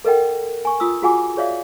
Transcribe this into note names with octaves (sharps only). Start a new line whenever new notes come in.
A4 A#4 D#5 F#5 G5
G#5 C#6
F4 D#6 E6
F4 F#4 G#4 F#5 G#5 D6
G#4 C#5 D5 E5 F5